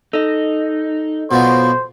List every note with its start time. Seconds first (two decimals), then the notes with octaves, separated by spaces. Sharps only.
0.13 D#4 A4 D#5
1.31 B2 F3 F#3 C5